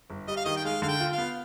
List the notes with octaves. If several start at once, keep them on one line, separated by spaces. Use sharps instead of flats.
G1
G3 D#5
F5
D#3 D#5
G5
G#3 F5
D3 F5
G5
F4
F5
B3